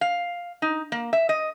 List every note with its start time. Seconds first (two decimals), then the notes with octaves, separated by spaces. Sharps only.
0.01 F5
0.62 D#4
0.92 A#3
1.13 E5
1.29 D#5